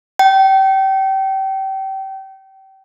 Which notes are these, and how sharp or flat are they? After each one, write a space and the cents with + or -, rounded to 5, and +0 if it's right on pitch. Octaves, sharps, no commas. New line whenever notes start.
G5 -30